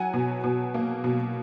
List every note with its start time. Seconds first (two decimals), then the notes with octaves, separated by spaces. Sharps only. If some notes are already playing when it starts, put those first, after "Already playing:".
Already playing: F#3 F#5 G#5
0.13 B2
0.44 B2
0.74 A#3
1.04 B2